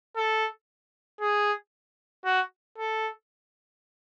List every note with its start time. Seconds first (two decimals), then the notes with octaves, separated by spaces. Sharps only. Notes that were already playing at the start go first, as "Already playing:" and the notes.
0.17 A4
1.21 G#4
2.25 F#4
2.78 A4